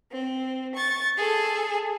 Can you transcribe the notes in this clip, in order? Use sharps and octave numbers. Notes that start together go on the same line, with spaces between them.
C4
C#6 A6
G#4 A4